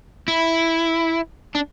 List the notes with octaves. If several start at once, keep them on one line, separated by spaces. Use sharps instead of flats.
E4
D4